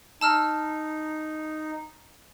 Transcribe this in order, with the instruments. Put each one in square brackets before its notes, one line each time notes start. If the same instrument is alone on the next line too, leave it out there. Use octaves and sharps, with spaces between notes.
[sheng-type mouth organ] D#4 [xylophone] A5 E6 F6